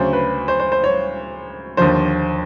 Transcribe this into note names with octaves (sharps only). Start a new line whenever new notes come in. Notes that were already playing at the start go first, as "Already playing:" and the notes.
Already playing: D2 C#3 F#3 C5
B4
C5
C5
C5
C#5
D#2 D3 F3 C5